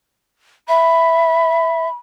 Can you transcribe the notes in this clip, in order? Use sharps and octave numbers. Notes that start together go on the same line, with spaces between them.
E5 B5